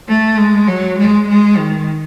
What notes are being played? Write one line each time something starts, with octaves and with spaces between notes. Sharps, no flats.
A3
G#3
F#3
G#3
G#3
D#3